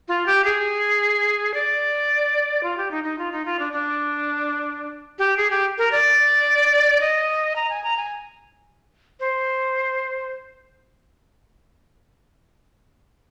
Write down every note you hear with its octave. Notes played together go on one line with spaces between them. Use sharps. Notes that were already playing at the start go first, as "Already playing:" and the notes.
F4
G4
G#4
D5
F4
G4
D#4
D#4
F4
D#4
F4
D4
D4
G4
G#4
G4
A#4
D5
D#5
A#5
G#5
A#5
G#5
C5